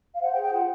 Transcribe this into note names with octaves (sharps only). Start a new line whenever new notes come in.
F5
C5 F#5
G5
G#4
G5
F4 F#5